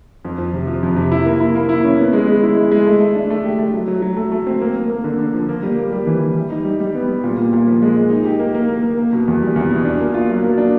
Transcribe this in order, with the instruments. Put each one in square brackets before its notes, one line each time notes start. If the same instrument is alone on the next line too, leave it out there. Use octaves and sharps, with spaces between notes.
[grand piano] F2
F3
C3
F3
F2
C3
E4
A#3
E4
A#3
E4
C#4
B3
G#3
G#3
E4
G#3
G#3
A3
A3
D4
A3
G4
A3
F#3
F#3
F#3
A3
A3
C4
A#3
A#3
A#3
D3
D3
F3
A#3
G3
A#3
G3
E3
E3
G3
D#4
G3
G3
B3
G3
A#2
A#2
A#2
F3
G#3
G#3
D#4
G4
A#3
A#3
A#3
A#3
A#3
B2
E2
G3
E2
B2
D4
A#3
F4
F#3
A#3
D4